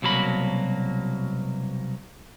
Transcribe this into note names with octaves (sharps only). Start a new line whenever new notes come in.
C2 B2 F#3 A#3 B5